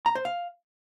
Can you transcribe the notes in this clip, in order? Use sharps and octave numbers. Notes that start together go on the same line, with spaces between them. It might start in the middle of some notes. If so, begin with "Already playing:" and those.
A#5
C5
F5